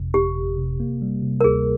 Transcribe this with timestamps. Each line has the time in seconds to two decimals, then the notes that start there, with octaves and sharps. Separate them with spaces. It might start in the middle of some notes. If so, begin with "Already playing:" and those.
Already playing: G1 F2 C3
0.14 G1 G4
0.37 G1
0.58 C3
0.80 A#3
1.02 G3
1.23 C3
1.41 A#4
1.44 D2 G#4